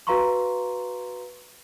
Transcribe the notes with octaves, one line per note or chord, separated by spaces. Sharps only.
F#4 B4 F5 A#5 C6 C#6